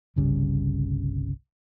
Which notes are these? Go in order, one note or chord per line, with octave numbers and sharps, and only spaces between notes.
G1 C2 C#3 G3